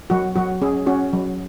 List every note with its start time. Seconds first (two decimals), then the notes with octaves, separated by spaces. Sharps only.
0.10 F#3 F#4
0.36 F#3 F#4
0.62 C#4 G#4
0.86 C#4 F#4
1.13 F#3